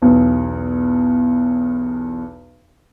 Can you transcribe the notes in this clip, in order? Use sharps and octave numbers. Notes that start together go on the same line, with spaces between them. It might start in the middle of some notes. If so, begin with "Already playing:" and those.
B1 E2